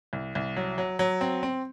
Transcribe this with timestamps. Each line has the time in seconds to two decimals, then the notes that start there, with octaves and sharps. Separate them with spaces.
0.13 C2
0.35 C2
0.56 F#3
0.78 F#3
0.99 F#3
1.21 C4
1.43 C4